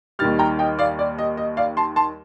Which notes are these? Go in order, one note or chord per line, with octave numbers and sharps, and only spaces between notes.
D#2 D#3 G3 F6 A6
G5 A#5
D#5 G5
D5 F5
D5
D#5
D#5
D5 F5
A5 C6
A5 C6